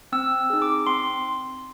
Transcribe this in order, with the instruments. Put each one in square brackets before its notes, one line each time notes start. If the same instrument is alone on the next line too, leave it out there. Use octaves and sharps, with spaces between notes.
[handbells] C4 E6
D#4 G#4
D6
C4 C6